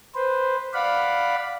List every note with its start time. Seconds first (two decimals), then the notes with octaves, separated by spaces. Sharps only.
0.15 B4 C5
0.73 D5 F5 F#5 B5